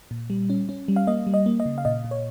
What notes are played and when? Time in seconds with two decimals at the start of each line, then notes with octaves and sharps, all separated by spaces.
0.11 A#2
0.30 G3
0.50 C#4
0.69 C#4
0.88 G3
0.96 F5
1.07 A#3 D#5
1.27 G3
1.34 D#5
1.46 A#3
1.60 D#5
1.66 C#3
1.78 F5
1.85 A#2 D#5
2.04 A#2
2.11 C#5